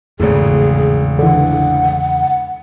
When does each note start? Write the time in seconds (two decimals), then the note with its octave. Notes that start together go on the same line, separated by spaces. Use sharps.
0.20 G#1 E2 A2 C#3 G#4
1.19 D3 E3 F#5